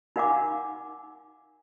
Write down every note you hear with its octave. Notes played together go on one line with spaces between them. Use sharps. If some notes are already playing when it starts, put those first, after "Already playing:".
D#4 A#4 F5 F#5 G#5 D6